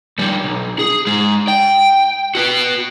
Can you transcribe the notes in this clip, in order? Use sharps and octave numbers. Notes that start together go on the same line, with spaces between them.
F2 G3
B1
G#4
G#3 D#4
G5
F#4 B4